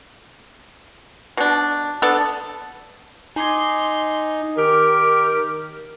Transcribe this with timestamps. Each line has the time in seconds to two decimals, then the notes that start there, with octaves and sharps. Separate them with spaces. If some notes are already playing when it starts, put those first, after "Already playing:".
1.37 B2 D4
2.02 B3 D4 A4
3.36 D#4 G#5 C6 D6 G#6
4.57 D#3 G4 A#4